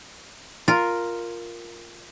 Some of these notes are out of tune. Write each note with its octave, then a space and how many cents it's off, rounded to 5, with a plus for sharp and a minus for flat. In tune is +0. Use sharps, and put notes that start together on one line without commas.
F4 +0 A#4 +0